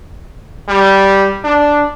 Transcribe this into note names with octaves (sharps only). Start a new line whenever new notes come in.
G3
D4